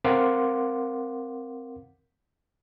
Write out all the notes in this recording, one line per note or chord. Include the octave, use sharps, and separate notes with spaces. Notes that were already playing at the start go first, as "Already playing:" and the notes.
C4 A#4 F5 F#5 C6 D6